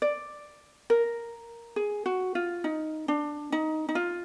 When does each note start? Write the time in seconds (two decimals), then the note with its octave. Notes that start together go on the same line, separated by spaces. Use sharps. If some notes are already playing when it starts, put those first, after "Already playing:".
0.02 D5
0.90 A#4
1.76 G#4
2.06 F#4
2.35 F4
2.64 D#4
3.08 D4
3.52 D#4
3.89 D#4
3.95 F4